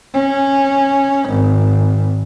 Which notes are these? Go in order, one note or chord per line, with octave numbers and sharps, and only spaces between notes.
C#4
G#1